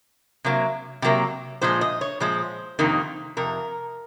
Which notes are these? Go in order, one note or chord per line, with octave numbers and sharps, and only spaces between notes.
C3 F#3 A#3
C3 F#3 A#3
A#2 F3 G#3 C5
D#5
C#5
A#2 F3 G#3 C5
F2 C3 D#3 A#3
F2 C3 A#4